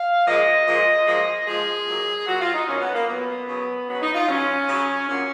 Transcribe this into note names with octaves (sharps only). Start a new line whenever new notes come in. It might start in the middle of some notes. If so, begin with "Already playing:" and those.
Already playing: F5
A#2 F3 G#3 D#5
A#2 F3 G#3
A#2 F3 G#3
A#2 F3 G#3 G#4
A#2 F#3
A#2 F#3 F#4
F4
D#4
A#2 F#3 C#4
B3
A#3
A#2 F#3 B3
C#3 F#3
C#3 F#3 B3
D#4
F4
C#3 F#3 C#4
C#3 F#3
A#2 F#3 C#4